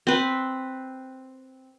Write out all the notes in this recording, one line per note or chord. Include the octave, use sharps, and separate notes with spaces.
C4 B4